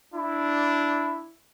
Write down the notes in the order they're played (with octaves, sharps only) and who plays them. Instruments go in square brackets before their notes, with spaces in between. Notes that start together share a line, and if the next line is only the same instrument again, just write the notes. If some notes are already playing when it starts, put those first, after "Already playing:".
[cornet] D4 [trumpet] E4